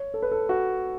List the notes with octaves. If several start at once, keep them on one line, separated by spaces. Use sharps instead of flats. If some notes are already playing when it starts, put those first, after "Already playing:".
Already playing: C#5
A4
B4
A4
F#4